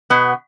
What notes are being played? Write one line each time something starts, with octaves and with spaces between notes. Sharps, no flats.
B2 B3